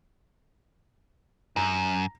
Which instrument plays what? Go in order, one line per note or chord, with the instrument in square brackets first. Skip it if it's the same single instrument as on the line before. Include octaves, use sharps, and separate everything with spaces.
[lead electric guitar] F#2 [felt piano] A#5